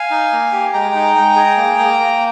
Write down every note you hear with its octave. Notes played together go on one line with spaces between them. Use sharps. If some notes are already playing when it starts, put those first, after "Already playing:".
Already playing: F5 G#5
D#4
A#3
G4
G#3 G5 A#5
D#4
G#3
G#4
A#3
A#3
A#3